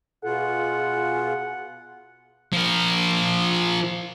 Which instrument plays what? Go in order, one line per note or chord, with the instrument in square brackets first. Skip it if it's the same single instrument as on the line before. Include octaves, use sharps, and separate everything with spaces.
[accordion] B2 F4 [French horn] G#4 [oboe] F#5
[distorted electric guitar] F3 A#4